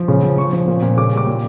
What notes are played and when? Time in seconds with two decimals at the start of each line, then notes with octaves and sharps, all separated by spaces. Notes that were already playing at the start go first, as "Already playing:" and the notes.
Already playing: F3
0.08 C#3
0.23 F3
0.38 F3 C#6
0.53 F3
0.68 A#2
0.82 A#2
0.97 C#3 D6
1.12 G3 D6
1.27 A#2